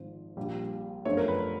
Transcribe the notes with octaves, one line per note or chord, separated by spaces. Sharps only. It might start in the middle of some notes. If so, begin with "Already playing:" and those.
Already playing: G#1 G#2 F3
A#1 A#2 G3
G1 F#2 D3 F3 A3 C#5
A#4
B4